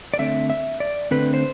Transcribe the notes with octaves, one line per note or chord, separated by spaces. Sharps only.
D5
D3 A3 C4 E5
E5
D5
D3 A3 C4 B4
C5